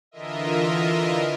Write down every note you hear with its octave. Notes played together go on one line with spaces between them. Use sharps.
D3 E3 F4 A#4 D#5 E5